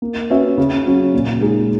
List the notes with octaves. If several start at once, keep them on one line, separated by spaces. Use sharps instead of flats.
A#3
C#4 F#4 B4 E5
C#3
F#3 C#4
A#2
G#3 D#4 G#4